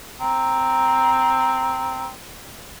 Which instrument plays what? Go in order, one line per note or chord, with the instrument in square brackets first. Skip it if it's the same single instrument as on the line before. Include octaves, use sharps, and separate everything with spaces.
[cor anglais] C4 [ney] A#5